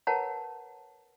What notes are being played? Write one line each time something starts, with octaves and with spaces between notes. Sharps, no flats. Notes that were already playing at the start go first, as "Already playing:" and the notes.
A#4 B4 C#5 F#5 A5 A#5